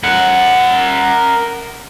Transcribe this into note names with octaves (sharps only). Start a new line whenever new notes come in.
A#4 F#5